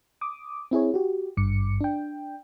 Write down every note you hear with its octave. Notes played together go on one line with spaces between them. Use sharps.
D6 D#6
C4 E4 G#4 C#5
F#4 G4
G#1 G2 D6 C#7
D4 G5